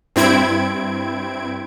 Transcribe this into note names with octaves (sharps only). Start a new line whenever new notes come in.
G2 C4 E4 G#6 D7